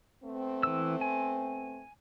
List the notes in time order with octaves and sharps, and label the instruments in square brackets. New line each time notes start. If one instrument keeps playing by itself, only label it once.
[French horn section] A3 B3 C4
[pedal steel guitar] E3 E6
G#5